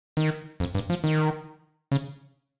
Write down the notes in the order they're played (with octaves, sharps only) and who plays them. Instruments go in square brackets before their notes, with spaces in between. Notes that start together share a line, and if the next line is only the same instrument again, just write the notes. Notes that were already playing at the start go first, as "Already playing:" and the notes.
[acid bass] D#3
F2
G2
F3
D#3
C#3